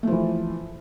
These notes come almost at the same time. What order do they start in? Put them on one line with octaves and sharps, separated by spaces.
A3 F3 E3